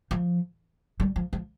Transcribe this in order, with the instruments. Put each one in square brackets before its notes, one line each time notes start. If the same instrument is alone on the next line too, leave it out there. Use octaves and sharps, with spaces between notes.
[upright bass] F3
G3
F3
F3